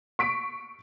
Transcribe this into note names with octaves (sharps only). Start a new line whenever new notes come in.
C#6 B6 D7